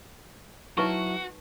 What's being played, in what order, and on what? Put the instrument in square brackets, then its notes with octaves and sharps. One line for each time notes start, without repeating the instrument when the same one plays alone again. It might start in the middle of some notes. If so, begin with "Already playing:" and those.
[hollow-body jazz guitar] F#3 E4 [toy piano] D#4 B4 C#6 [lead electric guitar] F#4